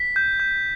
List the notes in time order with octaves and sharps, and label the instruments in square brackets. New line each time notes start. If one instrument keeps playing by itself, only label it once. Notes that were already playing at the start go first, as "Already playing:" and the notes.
Already playing: [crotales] B6
G6
G6